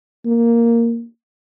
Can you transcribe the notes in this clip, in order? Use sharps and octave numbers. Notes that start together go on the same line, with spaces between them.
A#3